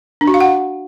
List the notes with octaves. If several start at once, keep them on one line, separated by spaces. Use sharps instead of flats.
D4
F#4
F5
F#5